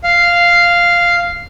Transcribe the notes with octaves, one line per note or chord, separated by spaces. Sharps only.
F5